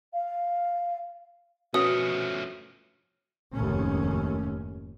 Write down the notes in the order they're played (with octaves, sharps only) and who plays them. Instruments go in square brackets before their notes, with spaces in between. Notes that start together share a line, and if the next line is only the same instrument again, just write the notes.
[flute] F5
[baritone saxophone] B2 [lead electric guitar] F3 A3 [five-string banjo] B3 C#4 F#4 [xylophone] D#6
[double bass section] F1 D#2 G#2 A3 C#4